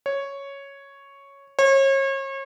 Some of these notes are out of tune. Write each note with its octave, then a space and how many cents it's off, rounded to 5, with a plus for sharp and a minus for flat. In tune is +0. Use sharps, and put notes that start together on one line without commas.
C#5 +0
C#5 -35